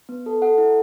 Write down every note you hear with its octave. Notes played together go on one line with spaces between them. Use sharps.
B3
A4
A4 F#5
E4